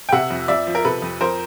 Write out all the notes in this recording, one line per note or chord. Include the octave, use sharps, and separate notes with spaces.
G5
C3 E5 F#5
F2
F2 D5 E5
F3
A#4
C3 A4 B4
F2
F2 A#4 C5